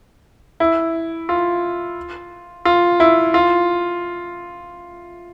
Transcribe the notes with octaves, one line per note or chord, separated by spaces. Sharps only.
E4
F4
F4
E4
F4